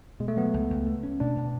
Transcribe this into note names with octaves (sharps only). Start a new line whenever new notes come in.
B2 G#3
A3
F#3 B3
C#2
C#2
A3
C#4
B2 D4
B2